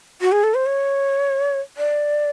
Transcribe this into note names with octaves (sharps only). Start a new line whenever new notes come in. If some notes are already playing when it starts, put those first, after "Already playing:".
F#4
G#4
A4
C5
C#5
D5